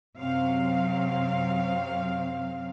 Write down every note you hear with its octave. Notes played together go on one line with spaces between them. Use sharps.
F#2 C3 F#3 C4 F5